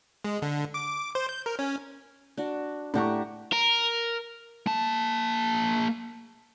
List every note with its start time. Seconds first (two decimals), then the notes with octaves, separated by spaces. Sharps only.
0.24 G#3
0.42 D3
0.74 D6
1.15 C5
1.29 G6
1.46 A#4
1.59 C#4
2.37 D4 F#4
2.94 A2 D4 G4 F#5 A#5 C#6
3.53 A#4
4.67 A#3 A5